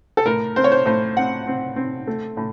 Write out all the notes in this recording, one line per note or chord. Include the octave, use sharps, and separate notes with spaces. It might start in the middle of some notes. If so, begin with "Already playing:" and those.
A4
A2 A#4
C4 C5
C#5
C5
A2 C5
C4 F#5
C4
C4
A3
A2